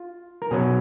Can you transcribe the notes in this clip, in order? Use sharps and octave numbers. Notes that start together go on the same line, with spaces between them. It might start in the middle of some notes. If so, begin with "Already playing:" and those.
Already playing: F4
A#4
B2 F#3 C#4 G#4